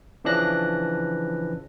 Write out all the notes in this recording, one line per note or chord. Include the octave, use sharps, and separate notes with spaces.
C#3 E3 F3 D4 F#6 A#6